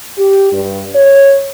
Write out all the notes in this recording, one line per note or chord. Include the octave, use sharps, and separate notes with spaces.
G4
G2
C#5